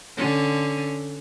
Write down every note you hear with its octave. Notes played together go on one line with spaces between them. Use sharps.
D3 C#4